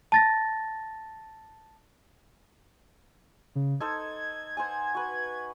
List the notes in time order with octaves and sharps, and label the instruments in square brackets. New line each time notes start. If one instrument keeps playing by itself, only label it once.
[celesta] A5 A6 A#6
[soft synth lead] C#3
[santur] D#4 A4 C5 [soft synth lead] G#6
[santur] C5 F#5 G#5
F#4 B4